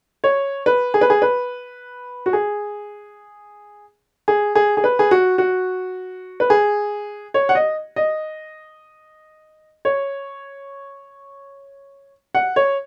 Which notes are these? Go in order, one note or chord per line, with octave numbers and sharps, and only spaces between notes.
C#5
B4
G#4
B4
G#4
B4
F#4
G#4
G#4
G#4
G#4
B4
G#4
F#4
F#4
B4
G#4
C#5
F#5
D#5
D#5
C#5
F#5
C#5